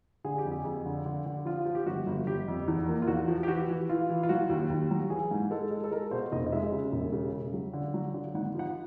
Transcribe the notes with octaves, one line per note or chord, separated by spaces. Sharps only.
D3 G#4
G4
F2
G#4
F2
D3
D3
D3
F3 F4
F3
G4
G1 F#4
G1
G1 G4
F2
E2
A#3
F4
E2 F#4
F3
G4
E3 F#4
E3
E3 F4
E3
F4
F#3 F#4
D#2
D#2
F#3
E3 G#4
G#2
G#3 A4
G#3
A4
G#3 A#4
B2 C5
F1 D#5
D#5
G#3 E5
C#3
E1
C#3
C#3
F#3
D3
F#3
D3
G#1 F#5
F3 F#5